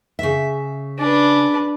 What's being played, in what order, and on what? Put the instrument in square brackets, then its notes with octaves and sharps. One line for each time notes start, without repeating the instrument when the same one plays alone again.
[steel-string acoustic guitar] C#3 E5
[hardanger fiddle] D4 B4